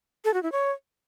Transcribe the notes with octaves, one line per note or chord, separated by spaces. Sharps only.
A4
F#4
E4
C#5